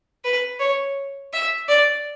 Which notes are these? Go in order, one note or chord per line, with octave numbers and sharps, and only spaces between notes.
B4
C#5
E5
D5